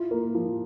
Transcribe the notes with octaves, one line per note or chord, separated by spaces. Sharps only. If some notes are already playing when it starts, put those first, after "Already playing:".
Already playing: E4 F4
A#3
F3